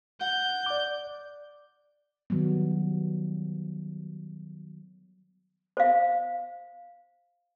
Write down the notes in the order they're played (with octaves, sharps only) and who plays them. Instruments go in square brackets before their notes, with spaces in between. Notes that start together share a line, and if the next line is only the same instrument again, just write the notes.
[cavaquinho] F#5 [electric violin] G6
[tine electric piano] D5 D6
[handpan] D#3 F#3 G3 B3
[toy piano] C5 F5